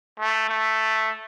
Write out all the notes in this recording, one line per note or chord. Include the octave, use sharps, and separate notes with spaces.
A3
A3